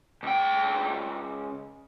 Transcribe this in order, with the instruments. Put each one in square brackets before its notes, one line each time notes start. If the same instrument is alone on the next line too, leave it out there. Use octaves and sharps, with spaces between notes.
[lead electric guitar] C#2 G5